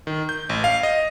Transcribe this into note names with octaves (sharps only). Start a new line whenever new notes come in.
D#3
G6
A1
F5
D#5